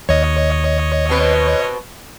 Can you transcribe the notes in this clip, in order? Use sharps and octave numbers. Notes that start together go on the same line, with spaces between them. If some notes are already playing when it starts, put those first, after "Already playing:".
D#2 C#5 D#5
B2 C4 B4